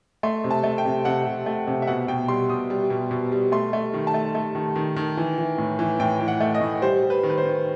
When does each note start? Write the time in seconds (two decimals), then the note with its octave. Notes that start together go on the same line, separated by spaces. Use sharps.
0.23 A3 C6
0.44 C3
0.51 A5
0.64 A3
0.78 G5
0.85 C3
1.05 C3 F#5
1.26 C3
1.46 A3
1.67 C3
1.82 E5
1.87 B2 F#5
2.08 B2 G5
2.28 G3 C6
2.49 B2 D#6
2.70 G3
2.90 B2
3.11 B2
3.32 G3
3.52 A3 C6
3.73 A3
3.94 D#3
4.07 A5
4.14 A3
4.35 A3
4.55 D#3
4.76 D#3
4.96 D#3
5.17 E3
5.38 E3
5.58 A2
5.79 E3
6.00 A2 G5
6.20 E3
6.28 F#5
6.40 A3
6.55 D#5
6.61 A2
6.82 G3 C5
7.02 G3
7.10 B4
7.23 D#3
7.30 B4
7.38 C5
7.44 D#3